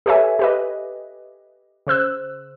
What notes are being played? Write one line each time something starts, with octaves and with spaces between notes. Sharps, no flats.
G4 A4 B4 C#5 E5 G#5
G4 B4 D#5
C#3 C5 E6 F#6